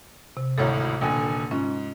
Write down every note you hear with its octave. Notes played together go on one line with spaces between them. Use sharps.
C3
G#1 D2 A2 A4 C#5 A#5
D#1 D3 G5 G#5
G#2 C#4 F4